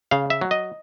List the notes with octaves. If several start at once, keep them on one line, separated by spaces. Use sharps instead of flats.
C#3 F5
E5
F#3
D#5